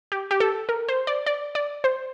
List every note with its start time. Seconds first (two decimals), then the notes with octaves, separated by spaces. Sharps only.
0.12 G4
0.31 G4
0.40 A4
0.69 A#4
0.88 C5
1.07 D5
1.26 D5
1.55 D5
1.84 C5